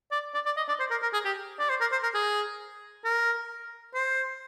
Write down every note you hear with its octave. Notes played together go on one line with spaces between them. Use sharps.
D5
D5
D5
D#5
D5
C5
A#4
A#4
G#4
G4
D5
C5
A#4
C5
A#4
G#4
A#4
C5